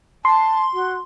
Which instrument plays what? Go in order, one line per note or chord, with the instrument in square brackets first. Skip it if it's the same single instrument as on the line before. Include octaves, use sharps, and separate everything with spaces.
[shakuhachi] A5 [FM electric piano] C6
[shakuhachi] F#4